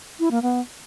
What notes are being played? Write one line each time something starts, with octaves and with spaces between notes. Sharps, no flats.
E4
A#3
B3